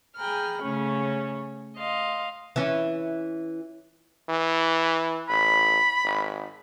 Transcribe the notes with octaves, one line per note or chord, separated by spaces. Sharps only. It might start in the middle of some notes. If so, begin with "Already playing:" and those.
G#4 G5 G#5 A#5 B5 F6
C#3 A3 C#4 C#5
D#5 F5 C6
E3 C#4
E3
A1 B5
G#1